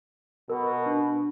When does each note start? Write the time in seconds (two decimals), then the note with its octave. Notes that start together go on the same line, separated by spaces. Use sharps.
0.50 B2 A#4
0.86 D4